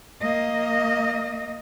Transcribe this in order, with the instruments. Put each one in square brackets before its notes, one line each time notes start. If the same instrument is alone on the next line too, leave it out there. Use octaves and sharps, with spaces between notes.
[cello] A#3 D#5